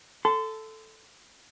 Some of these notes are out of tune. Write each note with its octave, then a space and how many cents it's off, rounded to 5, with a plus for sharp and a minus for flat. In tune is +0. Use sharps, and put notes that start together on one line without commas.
A4 +0 C6 -35